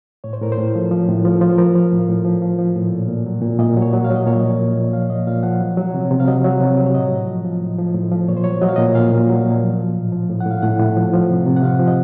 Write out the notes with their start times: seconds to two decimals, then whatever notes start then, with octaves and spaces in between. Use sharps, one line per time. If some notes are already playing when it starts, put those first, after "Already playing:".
0.24 A2 C#5
0.33 C5
0.41 A2 A#4
0.52 C5
0.58 A2
0.75 F3
0.91 F3
1.09 A2
1.25 F3
1.41 F3
1.50 C5
1.58 F3 A#4
1.75 F3
1.92 A2
2.09 A2
2.25 F3
2.42 F3
2.59 F3
2.76 A2
2.92 A#2
3.09 A#2
3.26 F#3
3.42 A#2
3.59 A#2 D#5
3.77 F#3
3.82 C#5
3.93 F#3
4.04 F5
4.10 F#3
4.16 D#5
4.26 A#2 C#5
4.39 F3 D#5
4.60 A#2
4.77 A#2
4.93 F3 F5
5.10 A#2 D#5
5.27 A#2 F5
5.43 F3 F#5
5.60 F#3
5.77 F#3
5.94 C3
6.11 C3
6.20 F5
6.27 F#3 D#5
6.44 F#3
6.60 C3
6.78 F#3
6.86 C#5
6.94 A2 D#5
7.12 A2
7.28 F3
7.44 F3
7.61 A2
7.78 F3
7.95 A2
8.12 F3
8.28 A#2 C#5
8.37 C5
8.44 F#3 C#5
8.62 F#3 D#5
8.69 F5
8.76 A#2 D#5
8.95 A#2 F5
9.13 A#2
9.29 F#3
9.46 A#2
9.62 F3
9.79 F3
9.96 A2
10.12 F3
10.29 A2
10.40 F#5
10.46 A2
10.51 F5
10.62 A2 F#5
10.80 A2
10.97 F3
11.13 F3
11.30 C3
11.46 C3
11.56 F#5
11.63 C3 F5
11.79 F3
11.87 D#5